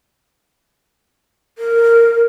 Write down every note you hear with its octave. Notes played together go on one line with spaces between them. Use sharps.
A#4